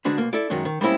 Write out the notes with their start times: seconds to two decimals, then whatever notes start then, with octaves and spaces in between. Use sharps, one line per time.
0.05 D3 G#3 D4 F#4 B4
0.18 B1 A#3
0.33 E4 A4 D5
0.50 F#2 D#3 F#3 G#3 C#4
0.65 D#3
0.81 G3 G#3 A#3 C4 C#4 E4